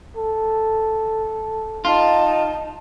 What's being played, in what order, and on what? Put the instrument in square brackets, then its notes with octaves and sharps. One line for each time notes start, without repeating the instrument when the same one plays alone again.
[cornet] A4
[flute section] D#4 A5 [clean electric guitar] F4